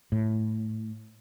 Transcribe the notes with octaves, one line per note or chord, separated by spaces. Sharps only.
A2